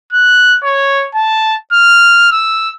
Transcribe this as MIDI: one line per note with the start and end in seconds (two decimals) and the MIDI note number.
0.13 0.58 90
0.63 1.05 73
1.15 1.54 81
1.73 2.27 89
2.32 2.70 88